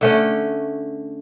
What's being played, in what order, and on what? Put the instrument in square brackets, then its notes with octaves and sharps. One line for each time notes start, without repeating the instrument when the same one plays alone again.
[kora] D3 A3 C#4